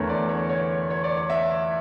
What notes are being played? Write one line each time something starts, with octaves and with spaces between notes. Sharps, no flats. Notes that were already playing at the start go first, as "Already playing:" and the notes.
Already playing: E2 D3 A3 A#4 C#5
D5
C#5
C#5
C#5
D5
C#5
E5